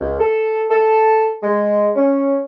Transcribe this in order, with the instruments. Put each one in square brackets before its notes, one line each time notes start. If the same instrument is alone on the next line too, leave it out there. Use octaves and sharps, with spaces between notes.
[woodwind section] C#2
A4
A4
G#3
C#4